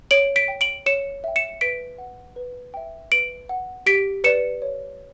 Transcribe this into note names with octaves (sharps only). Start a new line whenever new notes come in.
C#5 D7 F#7
B6 D7
G5
D7 F#7
C#5 C#7 E7
E5 G5
C#7 E7
B4 B6 D7
F#5
B4
E5 G5
B4 D7 F#7
F#5
G4 B6 D7
B4 D5 C#7 E7
C#5